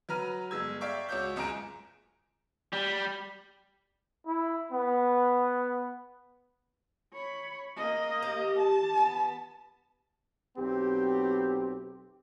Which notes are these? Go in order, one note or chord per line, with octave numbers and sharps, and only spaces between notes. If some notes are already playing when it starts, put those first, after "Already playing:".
F#3 B4 A#5 F6 D#7
G1 G#3 E6 G#6
D5 E5 F5 G5 C#6 D6
C#2 F#4 C#5 D6 G6
F#1 C#2 G#5 A#5 D7
G3
E4
B3
C#5 B5
A#3 D#5
G4
A5
B3
B1 C4 G4